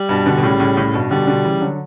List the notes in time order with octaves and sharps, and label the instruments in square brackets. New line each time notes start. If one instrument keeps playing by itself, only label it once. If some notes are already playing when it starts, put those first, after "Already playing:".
Already playing: [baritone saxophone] G3
[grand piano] G2 B2
B2 D3
B2
A2 C#3
A2 C#3
A2 C#3
G2 B2
[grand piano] B2 D3 [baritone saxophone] G3
[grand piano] B2 D3
C#3 E3
D3 F#3